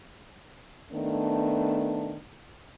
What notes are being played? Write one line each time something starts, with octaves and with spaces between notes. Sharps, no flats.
D#3 A3 B3 D4